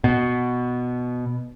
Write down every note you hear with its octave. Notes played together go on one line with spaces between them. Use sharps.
B2